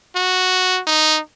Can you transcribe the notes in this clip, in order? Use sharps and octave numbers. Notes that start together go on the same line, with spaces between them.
F#4
D#4